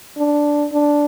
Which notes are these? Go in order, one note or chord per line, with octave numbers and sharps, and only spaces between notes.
D4
D4